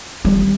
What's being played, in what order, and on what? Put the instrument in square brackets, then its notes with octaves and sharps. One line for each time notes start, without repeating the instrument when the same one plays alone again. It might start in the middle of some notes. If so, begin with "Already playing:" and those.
[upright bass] G3